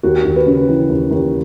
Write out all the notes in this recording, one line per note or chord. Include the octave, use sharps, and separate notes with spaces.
D#2 F#4
D#2
B4
C#3
E3
D#2
D#2